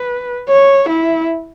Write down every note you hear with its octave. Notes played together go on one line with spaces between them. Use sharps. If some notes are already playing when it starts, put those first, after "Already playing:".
Already playing: B4
C#5
E4